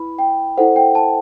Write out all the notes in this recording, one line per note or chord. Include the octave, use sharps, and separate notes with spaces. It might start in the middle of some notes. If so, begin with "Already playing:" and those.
Already playing: E4 B4 B5
G5
E4 A4 C5 F#5
G5
A5